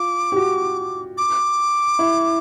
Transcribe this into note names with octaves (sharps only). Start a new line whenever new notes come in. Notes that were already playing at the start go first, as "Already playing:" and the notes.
Already playing: F4 D6
G4
F#4
D6
E4